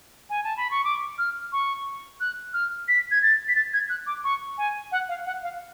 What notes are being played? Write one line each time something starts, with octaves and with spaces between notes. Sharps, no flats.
G#5
A5
B5
C#6
D6
F6
C#6
F#6
F6
B6
G#6
A6
B6
A6
G#6
F#6
D6
C#6
G#5
F#5
F5
F#5
F5